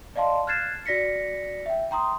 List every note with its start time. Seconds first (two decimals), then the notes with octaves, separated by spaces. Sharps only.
0.16 D5 D#5 F5 A5 C6
0.47 F6 F#6 G#6 A6 C7 E7
0.86 F#4 D5 A#6 B6 C#7
1.66 E5 G5
1.91 G5 A#5 C6 D#6